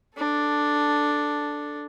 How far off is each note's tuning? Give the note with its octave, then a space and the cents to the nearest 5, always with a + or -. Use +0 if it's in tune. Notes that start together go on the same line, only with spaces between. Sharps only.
D4 +0 A4 +0